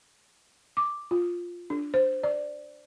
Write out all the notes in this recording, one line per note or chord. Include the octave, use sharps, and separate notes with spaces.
D6
F4
D4
C5
D5